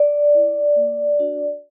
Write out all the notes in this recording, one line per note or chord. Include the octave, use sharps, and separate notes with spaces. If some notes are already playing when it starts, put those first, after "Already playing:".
Already playing: D5
E4
A#3
D4 F#4